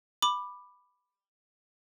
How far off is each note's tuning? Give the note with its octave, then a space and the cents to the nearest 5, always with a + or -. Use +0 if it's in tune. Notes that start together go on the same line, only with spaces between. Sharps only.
B5 +0 D6 +15